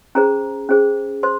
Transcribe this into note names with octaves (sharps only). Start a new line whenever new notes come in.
C#4 G#4 C5 A#5
C#4 G#4 C5
C5 C6